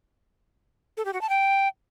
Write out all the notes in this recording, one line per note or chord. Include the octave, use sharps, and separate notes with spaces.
A4
G4
F#4
A5
G5